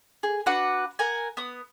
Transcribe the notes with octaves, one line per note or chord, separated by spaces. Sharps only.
G#4
D4 F#4 B4 F#5
A#4 F#5 G#5
B3 D#6